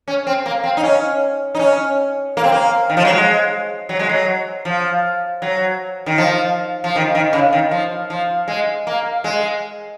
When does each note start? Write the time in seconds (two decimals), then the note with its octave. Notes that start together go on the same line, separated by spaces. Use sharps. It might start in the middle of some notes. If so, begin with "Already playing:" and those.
0.08 C#4
0.27 C4
0.46 A#3
0.64 C4
0.77 D#4
0.83 C#4
1.55 D#4
1.59 C#4
2.37 A#3
2.44 C4
2.52 A#3
2.89 D#3
2.97 F3
3.05 F#3
3.13 G#3
3.89 F#3
3.99 G#3
4.09 F#3
4.65 F3
5.42 F#3
6.06 D#3
6.18 F3
6.84 F3
6.96 D#3
7.15 D#3
7.33 C#3
7.53 D#3
7.71 F3
8.10 F3
8.48 G#3
8.87 A#3
9.24 G#3